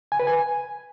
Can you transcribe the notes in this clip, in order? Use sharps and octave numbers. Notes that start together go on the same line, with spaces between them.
G#5
B4
G#5